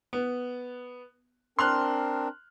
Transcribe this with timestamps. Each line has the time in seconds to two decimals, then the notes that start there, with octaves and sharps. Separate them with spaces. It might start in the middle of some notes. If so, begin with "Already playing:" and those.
0.13 B3
1.59 C4 D4 A#4 C6 F6 F#6